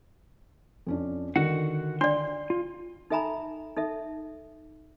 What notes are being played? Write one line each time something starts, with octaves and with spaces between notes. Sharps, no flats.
F2 C#4 D4
D3 D#3 F#4 F#5
D4 D5 C6
F4
D#4 A4 E5 G#5 A#5 B5
D#4 A4 E5